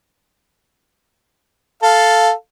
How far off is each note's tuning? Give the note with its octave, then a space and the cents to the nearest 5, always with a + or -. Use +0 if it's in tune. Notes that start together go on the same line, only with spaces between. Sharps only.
A4 +0 F5 +0